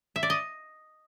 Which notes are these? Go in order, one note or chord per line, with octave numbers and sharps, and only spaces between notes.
E5
D5
D#5